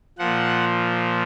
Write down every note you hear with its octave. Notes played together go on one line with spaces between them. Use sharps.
A#2 F3 F#5